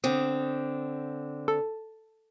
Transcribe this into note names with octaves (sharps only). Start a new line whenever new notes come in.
D3 C4 D#6
A4